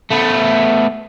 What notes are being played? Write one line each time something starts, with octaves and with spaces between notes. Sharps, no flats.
A3 B3